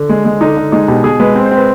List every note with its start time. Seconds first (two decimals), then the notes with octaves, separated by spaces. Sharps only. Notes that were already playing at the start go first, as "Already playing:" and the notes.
Already playing: D3
0.09 G#3
0.25 G#3
0.41 D3 D#4
0.57 D3
0.72 G#3 D#4
0.88 B2 G4
1.04 B2 G#4
1.20 G#3 B4
1.35 C4
1.46 C5
1.51 C4
1.57 B4